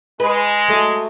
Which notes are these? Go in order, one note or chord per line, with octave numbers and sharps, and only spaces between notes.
G#3 B4
F#3 A3